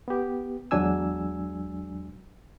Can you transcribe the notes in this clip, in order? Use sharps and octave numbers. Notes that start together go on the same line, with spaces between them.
B3 G4
E2 F#3 G#3 D4 G#5 E6